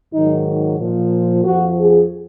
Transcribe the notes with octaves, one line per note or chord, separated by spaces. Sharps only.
G#2 D#3 F#3 D#4
A#2 F3
F2 F3 F#4
G#4